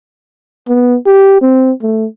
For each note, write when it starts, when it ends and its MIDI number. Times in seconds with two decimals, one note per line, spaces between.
0.68 0.96 59
1.06 1.40 67
1.42 1.71 60
1.82 2.06 57